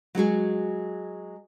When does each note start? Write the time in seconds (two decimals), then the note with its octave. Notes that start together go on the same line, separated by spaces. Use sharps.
0.15 F#3 G#3 F#4 G#4